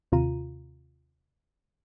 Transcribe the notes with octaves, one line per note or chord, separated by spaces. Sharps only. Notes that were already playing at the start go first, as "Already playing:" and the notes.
D#2 C3 F4 A#5 D#7